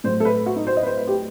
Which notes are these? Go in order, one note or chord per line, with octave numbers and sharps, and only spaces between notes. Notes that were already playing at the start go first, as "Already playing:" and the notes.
A2 F#3 C5
A4
B4
F#4
D#4
C5
D#5
B4
C5
B4
G4